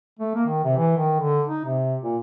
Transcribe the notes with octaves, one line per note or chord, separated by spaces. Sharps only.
A3
A#3
D#3
C3
E3
D#3
D3
D#4
C3
A#2